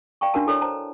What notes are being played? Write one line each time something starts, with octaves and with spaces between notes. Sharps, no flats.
D5 F5 G5 A5 C#6
D4 F#4 A#4 F5 A5
E4 A4 C#5 D5
C5 A5 A#5